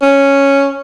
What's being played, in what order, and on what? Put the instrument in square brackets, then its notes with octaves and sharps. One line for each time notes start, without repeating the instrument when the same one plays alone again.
[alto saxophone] C#4